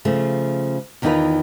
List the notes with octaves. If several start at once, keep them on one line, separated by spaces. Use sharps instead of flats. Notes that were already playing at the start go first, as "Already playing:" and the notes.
C#3 F3 A3
E2 D#3 E3 D#4 F4 B4